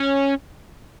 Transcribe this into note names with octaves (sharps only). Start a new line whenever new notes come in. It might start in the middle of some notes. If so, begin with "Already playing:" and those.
Already playing: C#4